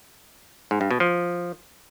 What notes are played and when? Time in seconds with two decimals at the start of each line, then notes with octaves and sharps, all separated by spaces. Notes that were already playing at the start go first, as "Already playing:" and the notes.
0.71 G#2
0.81 G2
0.91 B2
1.00 F3